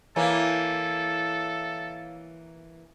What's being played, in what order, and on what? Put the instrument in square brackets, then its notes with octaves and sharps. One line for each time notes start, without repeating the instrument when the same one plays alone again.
[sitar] E3 A#3 [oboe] A4 [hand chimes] C#5 E5 F5